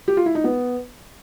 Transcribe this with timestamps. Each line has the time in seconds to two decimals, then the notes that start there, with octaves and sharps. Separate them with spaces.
0.08 G4
0.17 F4
0.26 E4
0.35 D#4
0.44 B3